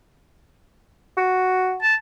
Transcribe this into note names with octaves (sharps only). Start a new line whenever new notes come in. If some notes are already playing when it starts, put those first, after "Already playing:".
F#4
A5